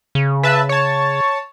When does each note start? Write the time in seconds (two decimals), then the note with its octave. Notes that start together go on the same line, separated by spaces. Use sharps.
0.15 C#3
0.43 B4 E5 A5
0.69 C#5 A5